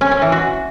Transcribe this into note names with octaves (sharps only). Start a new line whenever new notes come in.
C#4
C#4
E3
F#4